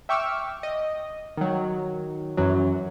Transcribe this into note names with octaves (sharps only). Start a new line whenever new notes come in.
E5 G5 C#6 D6 E6 F6
D#5
D#3 F#3
F#2 E3 F#3